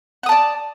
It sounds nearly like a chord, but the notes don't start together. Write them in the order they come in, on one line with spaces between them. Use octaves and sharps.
F#5 D#6 A5 D5